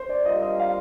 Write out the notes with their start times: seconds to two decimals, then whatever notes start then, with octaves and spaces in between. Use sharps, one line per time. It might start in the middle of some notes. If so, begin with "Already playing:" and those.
Already playing: C5
0.09 D5
0.25 G3 C4 F4 A#4 D#5
0.42 D#5
0.59 F5